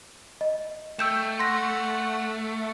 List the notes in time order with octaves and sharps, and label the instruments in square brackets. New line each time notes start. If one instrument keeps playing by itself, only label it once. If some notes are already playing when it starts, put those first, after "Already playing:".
[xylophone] D#5
[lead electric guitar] A3 [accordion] G5 [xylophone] E6 G6 E7
[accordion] F#5 [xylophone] C6 A#6